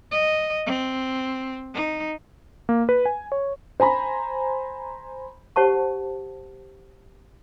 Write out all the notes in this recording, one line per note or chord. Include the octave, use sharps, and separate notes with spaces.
D#5
C4
D#4
A#3
B4
G#5
C#5
C5 G#5 A#5 B5
G4 C5 F#5 A5 C#6